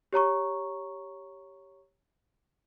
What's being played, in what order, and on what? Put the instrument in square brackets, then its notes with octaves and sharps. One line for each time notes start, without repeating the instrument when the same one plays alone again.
[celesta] G4 C#5 A#5 C#6